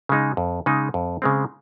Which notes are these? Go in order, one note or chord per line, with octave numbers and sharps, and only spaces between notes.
C#3 G#3 D#4
F2
C#3 G#3 D#4
F2
C#3 G#3 C4